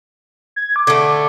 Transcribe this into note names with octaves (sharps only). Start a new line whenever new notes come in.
G#6
D6
D3 A3